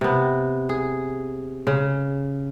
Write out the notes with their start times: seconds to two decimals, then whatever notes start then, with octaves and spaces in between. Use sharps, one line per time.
0.01 C3 B3
0.69 G#4
1.67 C#3